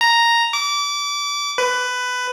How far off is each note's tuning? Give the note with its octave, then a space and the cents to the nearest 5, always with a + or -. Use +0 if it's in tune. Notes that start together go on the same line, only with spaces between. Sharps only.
A#5 +0
D6 -25
B4 +15